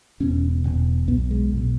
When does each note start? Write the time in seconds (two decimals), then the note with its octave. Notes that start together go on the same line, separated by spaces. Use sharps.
0.20 E1 E2 B2 C#4
0.64 E1 E2 B2
1.08 B1 B3
1.11 B2
1.31 G#3
1.53 B1 B2